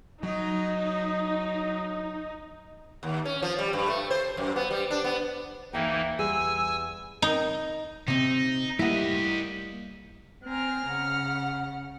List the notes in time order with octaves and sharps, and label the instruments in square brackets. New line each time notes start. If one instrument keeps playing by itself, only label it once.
[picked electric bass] F#3 [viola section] D#4
[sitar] D#2
C#4
F3
G3
G2
A3
C5
F#2
B3
G3
D4
B3
[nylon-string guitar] D2 E5 G5 [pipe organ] E3 A#3 D#4
[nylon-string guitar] E2 G3 G#4 [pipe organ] G#5 E6
[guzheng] D#4
[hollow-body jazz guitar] C3 C4 [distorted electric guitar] D#4
[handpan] G3 A3 A#3 [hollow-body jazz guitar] E4 F#5 [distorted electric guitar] G4 D#5
[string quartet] C4 G#5 A#5 [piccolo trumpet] F6
[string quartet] C#3 F#5